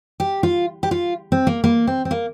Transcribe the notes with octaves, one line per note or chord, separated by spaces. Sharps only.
G4
F4
G4
F4
C4
A#3
A#3
C4
C4
A#3